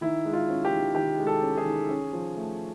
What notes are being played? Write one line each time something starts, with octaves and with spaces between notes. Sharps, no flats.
D#3 E4
G#3
F4
C#4
G4
D#3
D#3 G4
G#3
A4
C#4
G#4
D#3
C#4
F3
A3